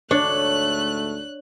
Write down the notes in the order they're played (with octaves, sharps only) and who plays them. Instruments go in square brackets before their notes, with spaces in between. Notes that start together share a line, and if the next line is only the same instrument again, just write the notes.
[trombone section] D2 G#2 A3 [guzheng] D4 [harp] C#5 [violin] F#6